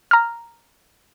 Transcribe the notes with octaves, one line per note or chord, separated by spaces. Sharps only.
A#5 F6